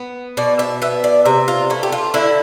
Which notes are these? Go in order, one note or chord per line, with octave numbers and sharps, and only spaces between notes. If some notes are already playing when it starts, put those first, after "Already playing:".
Already playing: B3
B2 D5
E5
B3 E5
D5
C3 E5
F4
A3 E4
G4
F4
D3 E4